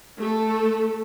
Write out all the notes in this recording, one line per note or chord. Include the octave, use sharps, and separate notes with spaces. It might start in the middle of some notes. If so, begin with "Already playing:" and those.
A3 A4